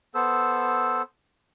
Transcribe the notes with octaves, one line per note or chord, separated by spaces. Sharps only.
B3 A4 C5 E6